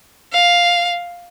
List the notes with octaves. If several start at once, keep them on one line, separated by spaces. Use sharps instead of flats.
F5